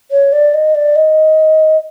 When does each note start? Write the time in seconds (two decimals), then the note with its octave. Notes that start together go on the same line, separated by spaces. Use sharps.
0.11 C#5
0.32 D5
0.54 D#5
0.74 D5
0.95 D#5